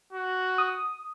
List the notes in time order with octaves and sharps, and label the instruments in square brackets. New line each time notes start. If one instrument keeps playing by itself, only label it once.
[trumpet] F#4
[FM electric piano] D#6